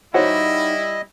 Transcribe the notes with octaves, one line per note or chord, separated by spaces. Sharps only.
G3 D#4 E4 F#4 C5 C#5 D#5 F#5